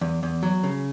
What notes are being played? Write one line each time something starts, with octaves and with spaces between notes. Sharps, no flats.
E2
E2
F#3
C#3